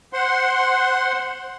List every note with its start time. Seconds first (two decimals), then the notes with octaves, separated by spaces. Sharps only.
0.13 C5 F#5 C6